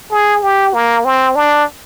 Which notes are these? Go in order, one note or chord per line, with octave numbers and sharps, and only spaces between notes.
G#4
G4
A#3
C4
D4